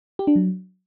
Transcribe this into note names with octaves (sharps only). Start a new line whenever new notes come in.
G4
D4
F#3